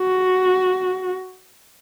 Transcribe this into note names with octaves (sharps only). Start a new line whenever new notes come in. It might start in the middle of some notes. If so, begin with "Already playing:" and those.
Already playing: F#4